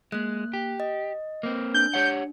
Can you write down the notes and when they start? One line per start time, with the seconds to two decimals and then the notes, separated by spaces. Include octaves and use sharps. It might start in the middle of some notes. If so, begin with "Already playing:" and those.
0.12 G#3 A#3 F#6
0.53 G4
0.80 D#5
1.43 A#3 C4
1.74 D4 G6
1.94 G4 C#5 F#5